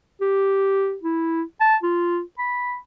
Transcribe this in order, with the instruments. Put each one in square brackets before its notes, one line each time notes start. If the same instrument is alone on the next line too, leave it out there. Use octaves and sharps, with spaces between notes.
[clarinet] G4
E4
A5
F4
B5